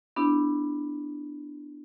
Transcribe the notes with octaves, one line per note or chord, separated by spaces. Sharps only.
B3 D4 E4 G4